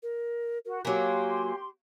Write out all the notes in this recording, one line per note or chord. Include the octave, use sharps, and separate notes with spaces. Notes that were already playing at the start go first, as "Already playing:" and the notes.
A#4
F#4 A#4
F#3 A#3 G4 G#5 C6